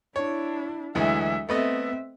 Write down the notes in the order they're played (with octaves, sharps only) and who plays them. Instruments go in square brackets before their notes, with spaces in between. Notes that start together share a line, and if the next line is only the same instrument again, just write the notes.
[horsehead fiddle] D4 E4 [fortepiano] C#5
[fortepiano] D2 E3 G#3 [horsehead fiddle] F#3 E5
[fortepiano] A3 B3 D#5 [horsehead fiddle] C4 E5